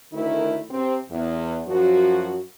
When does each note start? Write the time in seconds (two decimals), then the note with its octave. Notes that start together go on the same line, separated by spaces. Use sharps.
0.13 D2 D#3 A3 E4 A#4
0.70 C3 C4
1.10 E2
1.67 F#2 F3 F#4